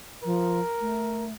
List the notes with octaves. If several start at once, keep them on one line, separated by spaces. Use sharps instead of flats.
F3 A#4
A3